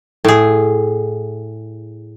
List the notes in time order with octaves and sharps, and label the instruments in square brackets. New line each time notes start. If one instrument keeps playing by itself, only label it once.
[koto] A2 G#4